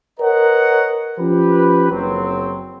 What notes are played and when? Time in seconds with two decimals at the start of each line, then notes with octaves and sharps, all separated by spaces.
0.19 A#4 B4 C#5 D#5 F#5 A#5
1.18 F3 C#4 G4 B4
1.90 F#1 F#3 C4